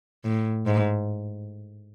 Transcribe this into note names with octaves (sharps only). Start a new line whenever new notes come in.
A2
G#2